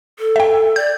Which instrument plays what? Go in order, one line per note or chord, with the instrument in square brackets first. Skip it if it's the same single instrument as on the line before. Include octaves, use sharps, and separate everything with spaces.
[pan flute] A4
[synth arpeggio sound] E5 G5
[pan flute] D5 [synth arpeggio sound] G6